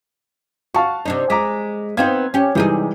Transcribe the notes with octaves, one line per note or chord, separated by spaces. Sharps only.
F#4 F5 A5 C#6
C3 D4 D#4
G#3 A#5 D6 B6
B3 C4 D#4 F5 G#6
C#4 G4
C3 E3 G3 G#3 D#4 G#4